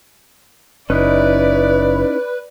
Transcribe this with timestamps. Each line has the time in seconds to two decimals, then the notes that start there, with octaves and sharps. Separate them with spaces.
0.90 F#1 C#4 D#4 E4 B4 D5